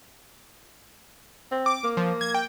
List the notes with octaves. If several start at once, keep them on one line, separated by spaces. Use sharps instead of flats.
C4
D6
A#3
F3
G#6
G5